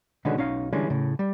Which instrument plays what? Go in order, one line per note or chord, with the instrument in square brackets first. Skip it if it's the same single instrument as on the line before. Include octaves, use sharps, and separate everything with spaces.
[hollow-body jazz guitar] B2 D3 D#3 G#3 B3 C#4
B1 C#4 D#4 F5
D3 E3 G3 G#3 C#4
A2 C#3
G3